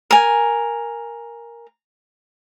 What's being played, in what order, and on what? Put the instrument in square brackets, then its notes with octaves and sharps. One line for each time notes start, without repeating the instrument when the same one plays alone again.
[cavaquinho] A#4 G#5